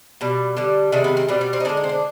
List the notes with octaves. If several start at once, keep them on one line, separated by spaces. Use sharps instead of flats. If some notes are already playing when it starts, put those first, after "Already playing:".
B2 G3
D3 G3
C3 D#3 G#3 D4
B3
C4
B2 G3 C4
B3
C4
D#4
D3 G#3 D4
D#4
C4
D4